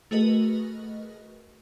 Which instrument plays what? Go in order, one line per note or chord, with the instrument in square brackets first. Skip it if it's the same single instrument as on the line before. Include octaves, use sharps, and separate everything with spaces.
[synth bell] A3 F#4 G#4 A#4 B4 D#5